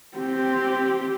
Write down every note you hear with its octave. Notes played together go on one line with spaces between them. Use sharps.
C4 G4